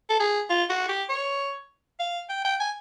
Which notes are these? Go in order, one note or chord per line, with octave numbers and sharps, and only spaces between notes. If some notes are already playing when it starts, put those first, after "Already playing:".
A4
G#4
F4
F#4
G4
C#5
F5
G5
G5
G#5